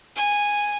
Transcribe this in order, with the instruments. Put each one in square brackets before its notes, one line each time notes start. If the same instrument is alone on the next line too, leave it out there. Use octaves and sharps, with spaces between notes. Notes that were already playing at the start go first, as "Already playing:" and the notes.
[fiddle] G#5